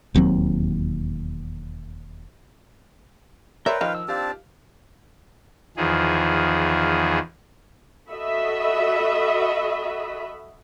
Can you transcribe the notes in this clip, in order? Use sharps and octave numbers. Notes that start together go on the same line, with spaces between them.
E1 D#2 F#3 C4
A#4 B4 C#5 D5 E5 G5 C6
D#3 F3 D#4 F4 F5 F6
E6
C4 D4 G4 F5 A5
E2 D#3 F3 G#4
F#4 A4 D#5 E5 B5